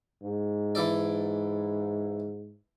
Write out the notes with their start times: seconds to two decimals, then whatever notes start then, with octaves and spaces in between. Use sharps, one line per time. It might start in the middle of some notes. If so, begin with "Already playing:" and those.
0.22 G#2
0.75 E3 A4 D5